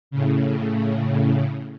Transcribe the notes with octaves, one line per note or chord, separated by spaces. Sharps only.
A2 C#3